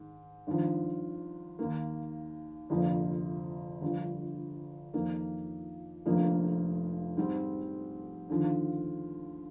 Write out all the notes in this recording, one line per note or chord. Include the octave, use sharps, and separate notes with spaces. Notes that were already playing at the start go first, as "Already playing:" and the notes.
Already playing: G#2 D#3
G#1 G2 F3
D#2 D#3 A#3
G1 F2 C3 F3 A#3
G1 G2 F3
F2 D#3 A#3
F1 F2 D3 F3 A#3
G#2 G3 C4
D#2 D3 F3